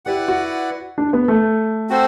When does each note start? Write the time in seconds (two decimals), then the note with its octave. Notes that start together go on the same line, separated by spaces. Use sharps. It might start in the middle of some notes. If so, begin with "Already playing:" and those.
0.05 E4 G4 B4 D5 F#5
0.28 F#4
0.98 D4
1.13 B3
1.28 A3
1.89 C4 F#4 A4 C5